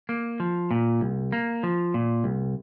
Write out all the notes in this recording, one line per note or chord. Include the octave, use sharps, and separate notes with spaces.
A#3
F3
A#2
C2
A#3
F3
A#2
C2